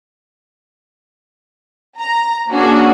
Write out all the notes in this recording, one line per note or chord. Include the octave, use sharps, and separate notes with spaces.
A#5
A#3 C#4 D4 F#4 G#4